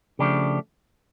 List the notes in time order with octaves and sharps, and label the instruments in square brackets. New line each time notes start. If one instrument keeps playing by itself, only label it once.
[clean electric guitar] C#3 F3 A3 D4 G4